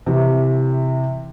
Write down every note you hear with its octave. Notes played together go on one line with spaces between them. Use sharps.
C3 E3